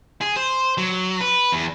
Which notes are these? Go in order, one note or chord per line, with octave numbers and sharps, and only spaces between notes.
G#4
C5
F#3
B4
E2